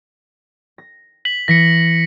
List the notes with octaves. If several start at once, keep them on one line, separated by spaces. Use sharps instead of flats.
A#6
B6 F#7
E3 A#6 B6 C#7